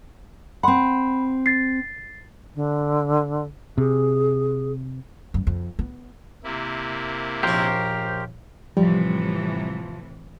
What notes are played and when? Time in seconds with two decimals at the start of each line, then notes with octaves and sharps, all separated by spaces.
0.63 C4 F#5 B5 C6
1.46 A6 C7
2.55 D3
3.78 C3 G#4
5.34 F#2
5.47 F2
5.79 B3
6.44 C3 A#3 E4
7.43 A#1 C#4 G4 A#4 C5
8.77 A2 C3 E3 F3 G3